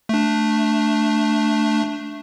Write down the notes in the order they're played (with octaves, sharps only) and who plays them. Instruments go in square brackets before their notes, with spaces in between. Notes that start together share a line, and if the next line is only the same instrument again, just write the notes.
[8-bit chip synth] A3 D4